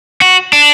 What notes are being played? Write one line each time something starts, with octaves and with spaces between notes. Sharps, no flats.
F#4
D4